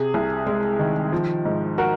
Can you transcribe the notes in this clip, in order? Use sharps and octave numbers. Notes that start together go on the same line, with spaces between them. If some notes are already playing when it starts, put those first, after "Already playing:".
Already playing: C3 G#4
C2
G#3
D#3
F3
G#2
F#4 A#4